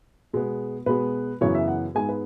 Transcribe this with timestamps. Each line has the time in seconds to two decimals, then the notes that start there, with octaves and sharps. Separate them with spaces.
0.33 B2 G#3 B3
0.86 B2 G#3 B3 B4
1.41 F#2 C#3 E3 B3 C#5
1.54 E5
1.68 F#5
1.95 G#2 G#3 B3 G#5
2.09 B4